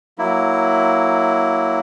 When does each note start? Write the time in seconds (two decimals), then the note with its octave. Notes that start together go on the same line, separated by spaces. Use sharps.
0.18 F#3 A#3 E4